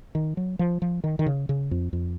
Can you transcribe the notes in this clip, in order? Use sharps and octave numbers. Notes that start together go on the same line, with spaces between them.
D#3
F#3
F3
F3
D#3
D#3
C#3
C#3
F2
F2